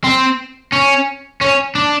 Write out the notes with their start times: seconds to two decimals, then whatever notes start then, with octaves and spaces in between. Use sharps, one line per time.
0.04 C4
0.73 C#4
1.41 C#4
1.75 D4